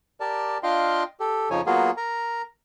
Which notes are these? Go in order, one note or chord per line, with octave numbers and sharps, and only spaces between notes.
G4 A#4 D5 A5
D4 F4 D#5 F5 G5 C6
G4 A4
F2 C#3 F3 D#4 C#5 G#5
F#3 A#3 B3 F4 F#4 G#4
A#4 A#5